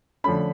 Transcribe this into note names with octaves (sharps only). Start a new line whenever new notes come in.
D3 F3 A3 C#4 B5